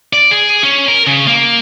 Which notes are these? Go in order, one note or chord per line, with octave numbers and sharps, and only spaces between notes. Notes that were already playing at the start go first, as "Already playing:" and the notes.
D5
G#4
C#4
A#4
C#3
A#3